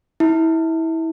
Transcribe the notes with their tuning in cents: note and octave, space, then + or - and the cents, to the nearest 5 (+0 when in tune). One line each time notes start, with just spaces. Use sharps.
E4 -25